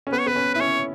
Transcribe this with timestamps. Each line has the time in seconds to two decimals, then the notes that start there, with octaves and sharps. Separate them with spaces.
0.07 C#4
0.12 B3 B4
0.20 C#5
0.26 B3 B4
0.36 C#4
0.54 E4 B4
0.60 C#4 C#5